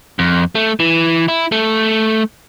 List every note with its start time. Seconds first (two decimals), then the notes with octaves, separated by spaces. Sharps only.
0.19 F2
0.55 A3
0.80 E3
1.28 E4
1.52 A3